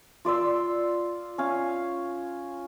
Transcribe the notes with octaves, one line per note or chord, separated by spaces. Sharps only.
F4 D5 C6 E6
C#4 C#5 F5